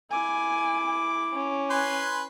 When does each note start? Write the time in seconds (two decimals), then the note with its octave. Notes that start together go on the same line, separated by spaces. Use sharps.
0.11 E4 G#5 D6
1.34 C#4
1.70 B4 G#5 C6